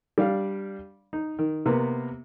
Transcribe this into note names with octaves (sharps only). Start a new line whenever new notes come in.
G3 D4 D5 F5
D#4
D#3
C3 A#3 B3